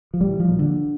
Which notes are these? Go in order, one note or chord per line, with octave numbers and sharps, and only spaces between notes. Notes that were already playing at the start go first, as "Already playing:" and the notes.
F3
A#1 G3
E3
F3
A#2
D3